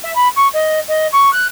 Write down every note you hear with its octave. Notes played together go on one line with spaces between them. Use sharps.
E5
B5
C#6
D#5
D#5
C#6
F#6